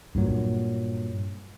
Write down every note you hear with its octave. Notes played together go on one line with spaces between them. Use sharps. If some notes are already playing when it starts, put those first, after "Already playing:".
G2 A#2 F#3